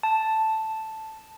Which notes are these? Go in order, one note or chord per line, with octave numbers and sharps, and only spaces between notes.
A5